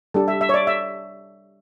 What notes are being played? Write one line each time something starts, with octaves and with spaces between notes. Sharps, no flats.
G3 D4 G4 A4
E5
E5
C#5
D5
E5